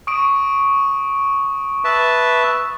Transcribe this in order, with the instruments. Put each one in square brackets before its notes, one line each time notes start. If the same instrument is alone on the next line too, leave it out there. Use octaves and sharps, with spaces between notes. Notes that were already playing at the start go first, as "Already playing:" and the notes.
[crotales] C#6 D#6 D7
[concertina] B4 E5 A5